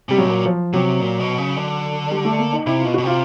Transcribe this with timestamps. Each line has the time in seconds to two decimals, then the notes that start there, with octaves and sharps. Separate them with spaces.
0.09 C3 G3
0.18 A2 F#3
0.27 A#2
0.46 F3
0.73 C3 F#3
1.00 A#2
1.19 B2
1.38 C#3
1.56 D3
2.11 G3
2.25 A3
2.39 A#3
2.53 D#4
2.66 C3 E4
2.80 B2 F4
2.94 B2 F#4
3.03 C3 F4